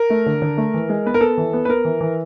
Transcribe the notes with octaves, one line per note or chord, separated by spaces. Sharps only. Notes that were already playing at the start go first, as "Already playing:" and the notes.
Already playing: A#4
A3
D3
D3
A3
E3
G#3
B3 B4
A#4
B3 A4
E3
B3
B4
B3 A#4
E3
E3